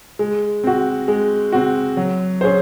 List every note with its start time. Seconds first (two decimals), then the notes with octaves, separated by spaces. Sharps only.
0.19 G#3
0.64 C4 F#4
1.08 G#3
1.52 C4 F#4
1.97 F#3
2.41 C#4 G#4 C5